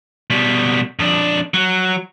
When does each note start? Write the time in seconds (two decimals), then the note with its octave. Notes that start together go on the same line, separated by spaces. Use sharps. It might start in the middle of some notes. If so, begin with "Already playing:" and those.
0.30 B2 G3
0.99 F2 D4
1.54 F#3